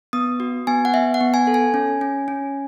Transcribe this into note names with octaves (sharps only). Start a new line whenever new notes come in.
B3 D#6
F#4
B3 G#5
F#5
B3 E5
F#5
B3
G#5
A4
G#5
C#4
C#4
C#4